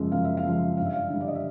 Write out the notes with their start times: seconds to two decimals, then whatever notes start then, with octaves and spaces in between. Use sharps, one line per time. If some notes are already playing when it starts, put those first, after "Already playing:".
Already playing: F#2 C#3 F3 G#3
0.12 F#2 F5
0.25 E5
0.37 F5
0.45 C#3 F3 G#3
0.77 G2 F5
0.86 E5
0.93 F5
1.10 D3 G3
1.21 D5
1.28 D#5
1.35 E5